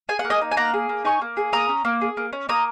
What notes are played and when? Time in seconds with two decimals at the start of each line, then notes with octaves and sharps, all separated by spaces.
0.09 G#4 G#5
0.19 F#5
0.25 A#3
0.30 D#5 G#5
0.42 D#4
0.52 G#5
0.57 A#3 F#5 A#5
0.73 G#4
0.89 A#3
1.05 D#4 G#5 C#6
1.21 A#3
1.37 G#4
1.52 A#3 A#5 D#6
1.69 C#4
1.85 A#3
2.01 G#4
2.17 A#3
2.33 C#4
2.49 A#3 A#5 D#6